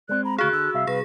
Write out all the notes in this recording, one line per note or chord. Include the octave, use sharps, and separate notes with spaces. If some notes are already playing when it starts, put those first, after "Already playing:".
G#3 C4 D5 F#6
A#5 B5
D2 F#4 G#4 F5 C#6 F#6
D3 E6
C2 E5 F5
C2 G#4 B4 A#6